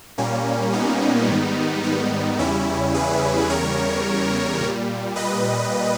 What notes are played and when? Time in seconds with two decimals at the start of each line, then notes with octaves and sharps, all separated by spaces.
0.18 A#2 G3 A#3 C#4
0.73 B3 D#4
1.28 G#2 D#3 G3
1.84 B3 D#4
2.39 E2 C#3 G3 C#4 E4
2.94 G#4 B4
3.50 E2 C#3 G3 A#4 C#5
4.60 A#2 G3
5.16 B4 D#5